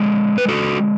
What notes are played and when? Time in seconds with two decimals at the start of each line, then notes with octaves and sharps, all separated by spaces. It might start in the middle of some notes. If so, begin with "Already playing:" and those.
Already playing: D3 G#3 D4
0.38 B4
0.48 F#4 A4